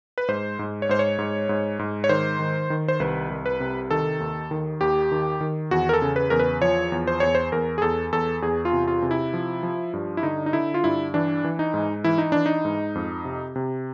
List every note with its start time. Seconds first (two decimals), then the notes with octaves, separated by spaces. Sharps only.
0.18 B4
0.28 G#2 C5
0.59 G#2
0.82 C#5
0.89 G#2 C5
0.99 C#5
1.19 G#2
1.49 G#2
1.79 G#2
2.04 C#5
2.09 D#3 C5
2.39 D#3
2.70 D#3
2.88 C5
3.00 C2 B4
3.30 C2
3.46 B4
3.60 C3
3.91 D#3 A4
4.20 D#2
4.51 D#3
4.81 D#2 G4
5.12 D#3
5.41 D#3
5.71 E2 F#4
5.89 A#4
5.93 A4
6.02 C#3
6.16 B4
6.30 E2 A#4
6.40 B4
6.62 F3 C#5
6.92 E2
7.07 C5
7.20 E2 C#5
7.35 C5
7.52 E2 A#4
7.78 G#4
7.82 E2 A4
8.13 E2 A4
8.42 E2 G#4
8.65 F4
8.72 C3
8.88 F4
9.03 C3
9.11 E4
9.33 F3
9.63 F3
9.93 G2
10.17 E4
10.23 D3 D#4
10.46 D#4
10.53 D3 E4
10.74 F4
10.84 G2 E4
11.14 E3 D4
11.44 E3
11.59 D#4
11.74 G#2
12.04 E3 E4
12.18 D#4
12.32 E3 D4
12.46 D#4
12.65 G#2
12.95 F2
13.25 C3
13.56 C3